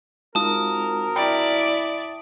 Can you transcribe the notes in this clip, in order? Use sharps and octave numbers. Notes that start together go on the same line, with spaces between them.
G#3 C4 D#4 F4 F#4 A#4 A5 D#6
E4 D5 G5 B5